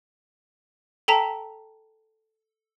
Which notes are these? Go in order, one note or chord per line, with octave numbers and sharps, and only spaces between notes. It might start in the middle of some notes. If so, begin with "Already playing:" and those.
A4 G5 A5 A#5 B6